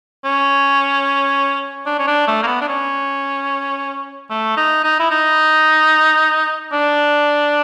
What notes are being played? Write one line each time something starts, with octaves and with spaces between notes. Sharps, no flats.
C#4
D4
C#4
D4
A3
A#3
B3
D4
C#4
A3
D#4
D#4
E4
D#4
D4